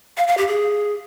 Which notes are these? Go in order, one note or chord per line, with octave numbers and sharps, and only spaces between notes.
F5
F5
G4
G#4